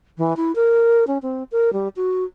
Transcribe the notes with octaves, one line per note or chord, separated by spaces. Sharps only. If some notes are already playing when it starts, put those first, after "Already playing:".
E3
E4
A#4
C#4
C4
A#4
G3
F#4